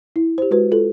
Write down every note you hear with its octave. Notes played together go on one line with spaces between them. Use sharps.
E4
G4 C5
G#3 F#4 B4
F4 A4